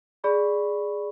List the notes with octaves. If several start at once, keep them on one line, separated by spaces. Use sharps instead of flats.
G#4 D5 B5 C#6